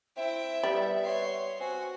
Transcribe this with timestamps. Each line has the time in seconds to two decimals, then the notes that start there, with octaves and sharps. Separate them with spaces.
0.17 C4 E4 E5 G5
0.63 G3 B3
1.04 C#5 C6
1.60 C4 F#4 G#5